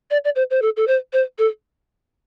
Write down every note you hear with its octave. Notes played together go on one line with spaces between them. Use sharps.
D5
D5
C5
C5
A4
A4
C5
C5
A4